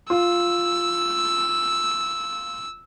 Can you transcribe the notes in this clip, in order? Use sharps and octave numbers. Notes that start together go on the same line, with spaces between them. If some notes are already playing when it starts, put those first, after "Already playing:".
F4 E6